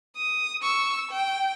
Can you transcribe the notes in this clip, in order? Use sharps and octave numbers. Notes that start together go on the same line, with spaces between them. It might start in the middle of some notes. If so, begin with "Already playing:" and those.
D#6
C#6 E6
G5